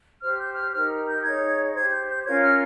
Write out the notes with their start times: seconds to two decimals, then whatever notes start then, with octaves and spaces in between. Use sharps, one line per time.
0.22 G4 C5 F6
0.40 G6
0.56 F6
0.73 D#4 G4 A#4 F6
1.07 G6
1.23 D#4 G#4 C#5 G#6
1.74 G4 C5 G#6
1.91 G6
2.08 G6
2.25 C#4 F4 A#4 C#5 G#6
2.42 F6